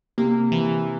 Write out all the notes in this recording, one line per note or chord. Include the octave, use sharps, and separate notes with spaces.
C3 A#3
E3